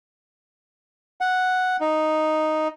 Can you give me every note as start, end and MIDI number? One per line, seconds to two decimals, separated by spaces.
1.21 1.77 78
1.81 2.68 63